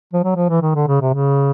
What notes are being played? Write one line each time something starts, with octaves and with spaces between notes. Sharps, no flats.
F3
F#3
F3
E3
D#3
D3
C#3
C3
C#3